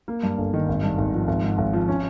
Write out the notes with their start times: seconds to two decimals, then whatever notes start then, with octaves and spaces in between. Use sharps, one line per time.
0.08 A#3
0.23 G2
0.38 G1
0.54 D#3
0.69 G#1
0.83 G2
0.98 G#1
1.13 F3
1.28 G#1
1.43 G#2
1.58 G#1
1.73 F3
1.88 C#4